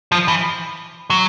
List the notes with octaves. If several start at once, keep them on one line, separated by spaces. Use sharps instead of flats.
F3
E3
F#3